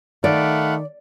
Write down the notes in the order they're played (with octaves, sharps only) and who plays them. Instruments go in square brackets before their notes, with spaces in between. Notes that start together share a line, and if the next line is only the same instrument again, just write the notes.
[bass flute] D#3 [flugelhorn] A3 [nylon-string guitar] D5 [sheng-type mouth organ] F5 F#5 B5